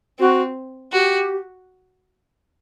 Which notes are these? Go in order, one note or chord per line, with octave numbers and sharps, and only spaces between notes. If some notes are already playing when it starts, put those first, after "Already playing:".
C4 F#4
F#4 G4